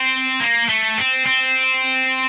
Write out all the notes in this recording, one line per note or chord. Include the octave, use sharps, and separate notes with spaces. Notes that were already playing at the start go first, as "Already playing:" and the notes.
Already playing: C4
A#3
A3
C4
C4